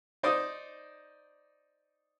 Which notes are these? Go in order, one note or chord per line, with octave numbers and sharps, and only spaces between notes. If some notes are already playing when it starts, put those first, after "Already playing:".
D#4 C5 D5 D#6